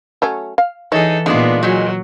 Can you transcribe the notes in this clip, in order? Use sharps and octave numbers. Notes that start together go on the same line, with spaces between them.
F#3 A3 C#4
F5
E3 D#4 G#4 A4 C#5
A#2 G#3 B3 D4 D#4 F4
A#2 F#3 G#3